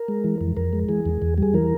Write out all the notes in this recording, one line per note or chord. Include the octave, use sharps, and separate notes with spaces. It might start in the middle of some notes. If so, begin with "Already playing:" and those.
Already playing: A#4
G#3
E3
F2
F2 A#4
G#3
E3 G#4
E2
E2
G3 G#4
E3 A#4